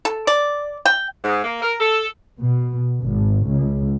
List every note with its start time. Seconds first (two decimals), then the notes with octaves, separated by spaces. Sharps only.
0.05 A4
0.27 D5
0.85 G5
1.24 G#2
1.44 A#3
1.63 A#4
1.81 A4
2.40 B2
3.01 G#1
3.47 C#2